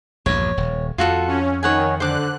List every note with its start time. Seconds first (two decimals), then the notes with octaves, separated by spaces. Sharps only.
0.26 A#1 E2 G2 C#5
0.57 D#1
0.98 F2 F4 F#4 A4
1.27 C#4
1.63 D#3 C#5 F#5 G#5
2.00 D3 C5 D6 F#6